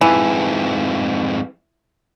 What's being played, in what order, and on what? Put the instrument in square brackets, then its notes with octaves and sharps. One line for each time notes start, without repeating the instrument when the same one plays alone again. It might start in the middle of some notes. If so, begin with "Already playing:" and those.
[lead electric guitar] F2 G#2 [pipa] E3